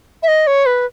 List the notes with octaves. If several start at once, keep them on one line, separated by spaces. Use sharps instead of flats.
E5
D#5
C#5
B4